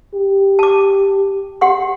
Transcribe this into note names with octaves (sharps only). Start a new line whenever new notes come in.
G4
A5 D6
G4 F#5 C6